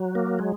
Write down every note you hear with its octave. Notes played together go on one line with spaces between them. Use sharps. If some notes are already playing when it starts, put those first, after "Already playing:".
Already playing: F#3
A#3
G#3